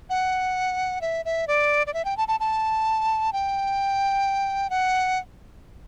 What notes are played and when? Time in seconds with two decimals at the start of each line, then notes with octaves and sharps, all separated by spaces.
0.10 F#5
1.01 E5
1.25 E5
1.47 D5
1.87 D5
1.94 E5
2.05 G5
2.17 A5
2.28 A5
2.40 A5
3.33 G5
4.70 F#5